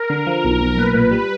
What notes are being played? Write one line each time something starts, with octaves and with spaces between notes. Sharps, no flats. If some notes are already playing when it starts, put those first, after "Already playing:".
Already playing: A#4
D3
F3
B1
B1
A#2 B4
A#2
G3